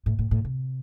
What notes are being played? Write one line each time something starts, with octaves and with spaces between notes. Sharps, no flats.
A2
A2
A2
C3